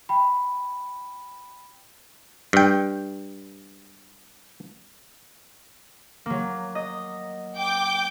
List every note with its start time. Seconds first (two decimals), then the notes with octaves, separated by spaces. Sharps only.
0.09 G5 B5
2.53 G2 G5
6.26 F#3 A#3
6.75 D#5
7.57 G5 D6 G6